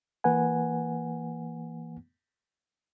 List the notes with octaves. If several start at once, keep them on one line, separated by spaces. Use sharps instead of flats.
E3 A#3 B4 F#5 G#5